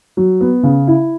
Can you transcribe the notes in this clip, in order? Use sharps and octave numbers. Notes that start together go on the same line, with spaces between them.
F#3
B3
C#3
E4